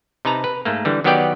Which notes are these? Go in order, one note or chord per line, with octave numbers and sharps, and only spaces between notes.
C3 D#4 B4 A5 A#5
B4
G#2 A3 A#3
D3 E3 G3
D#3 F#3 B3 G4 D5 G5